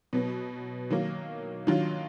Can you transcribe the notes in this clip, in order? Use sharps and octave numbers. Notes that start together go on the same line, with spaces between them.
B2 F#3 B3
D#3 F#3 A#3
D#3 F#3 D4 F4